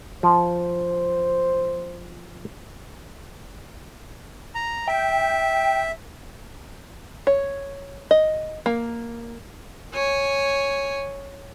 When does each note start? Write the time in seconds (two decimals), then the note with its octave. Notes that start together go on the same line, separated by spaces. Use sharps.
0.23 F3 C5
4.55 A#5
4.88 E5 G5
7.27 C#5
8.11 D#5
8.66 A#3
9.93 C#5 G#5